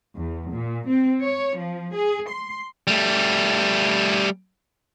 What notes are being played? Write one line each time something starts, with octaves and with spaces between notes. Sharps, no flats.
E2
A#2
C4
C#5
F3
G#4
C6
G3 A3